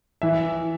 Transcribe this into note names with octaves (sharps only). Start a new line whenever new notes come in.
E3 E5